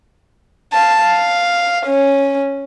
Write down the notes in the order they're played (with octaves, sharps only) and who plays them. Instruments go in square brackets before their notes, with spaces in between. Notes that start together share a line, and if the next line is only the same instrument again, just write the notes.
[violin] F5 A5
F5
C#4